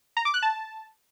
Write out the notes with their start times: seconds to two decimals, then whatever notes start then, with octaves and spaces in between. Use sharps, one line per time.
0.17 A#5
0.25 D6
0.34 F#6
0.43 A5